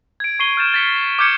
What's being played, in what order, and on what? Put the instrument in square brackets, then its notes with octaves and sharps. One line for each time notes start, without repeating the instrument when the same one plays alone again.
[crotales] G#6 D7
C#6 C7 D#7 G7
F6 G6 A6 E7
A6 B6 C#7
D6 F6 G6 G#6 C#7 E7